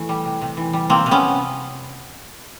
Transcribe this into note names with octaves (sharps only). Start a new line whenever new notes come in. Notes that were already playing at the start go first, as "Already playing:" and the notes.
Already playing: E3 A3
G3
C3
C3
E3
G3
C3 A#3 C4
C3
B3 C#4